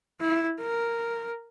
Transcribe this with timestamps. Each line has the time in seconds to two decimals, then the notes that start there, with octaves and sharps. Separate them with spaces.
0.20 E4
0.60 A#4